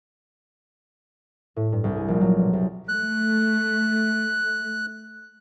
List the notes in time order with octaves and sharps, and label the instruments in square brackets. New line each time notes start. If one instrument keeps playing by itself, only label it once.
[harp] A2
G2
C2
G#4
A#1
F#3
B2
C2
[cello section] A3 [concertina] F#6